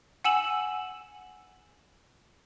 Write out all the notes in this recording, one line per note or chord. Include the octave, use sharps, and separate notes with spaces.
F#5 G#5 E6 E7 F#7